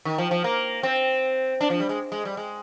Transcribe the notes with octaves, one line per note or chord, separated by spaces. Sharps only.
D#3
F3
F3
A#3
C4
D4
F3
G3
G#3
G#3
G3
G#3